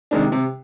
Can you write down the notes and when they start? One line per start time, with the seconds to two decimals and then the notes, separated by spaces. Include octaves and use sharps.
0.11 C3 D#3 G#3 D4
0.32 C3